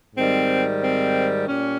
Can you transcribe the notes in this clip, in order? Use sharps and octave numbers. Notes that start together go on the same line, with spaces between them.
G#2 D#3 G3 C4
C4
A#2 G3 C#4